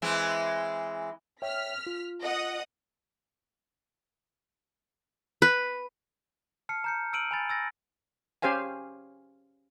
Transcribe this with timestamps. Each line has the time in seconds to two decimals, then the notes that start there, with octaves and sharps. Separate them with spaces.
0.02 E3 G#3 C4
1.42 C#5 E5 G5 F6 B6
1.87 F4
2.22 D#5 F#5 D#6
5.42 B4
6.69 A5 F6 C7 C#7
6.84 A#5 G6 C#7
7.13 E6 F6 D7 D#7 F#7
7.31 G#5 B5 A6
7.49 E6 A6 A#6
8.42 C#4 G4 C5 F5 G#5